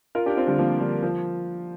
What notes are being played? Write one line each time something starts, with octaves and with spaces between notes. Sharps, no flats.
F4 A#4
D4 G4
C4 F4
D3 G3
F3 A#3
D3 G3
F3